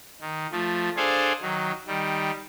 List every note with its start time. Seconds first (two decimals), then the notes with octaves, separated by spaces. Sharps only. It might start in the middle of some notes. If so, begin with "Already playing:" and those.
0.21 D#3
0.52 F3 A3
0.97 D4 G#4 A4 C5 F5 G#5
1.41 D#3 F#3
1.87 D#3 G3